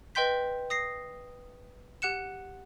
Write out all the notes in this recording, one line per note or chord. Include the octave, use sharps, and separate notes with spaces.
B4 D#5 G5 C6 G6 B6
D#6 A#6 C7
G4 F#5 F#6 C#7 E7